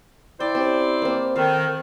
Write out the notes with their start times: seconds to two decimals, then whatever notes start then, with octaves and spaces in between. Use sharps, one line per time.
0.40 E4 C5 D5 G5
0.55 C4 C#4 G4
1.02 A#3 C4
1.36 D#3 A4 F5